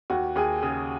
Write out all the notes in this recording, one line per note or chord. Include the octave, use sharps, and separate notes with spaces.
D#2 F#4
D#2 G#4
C#3 G#4